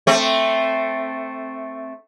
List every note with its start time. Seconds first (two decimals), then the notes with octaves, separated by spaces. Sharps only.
0.07 A3 C4